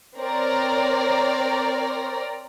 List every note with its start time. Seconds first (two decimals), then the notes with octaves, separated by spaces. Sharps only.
0.17 C4 A#4 C#5 D5 A#5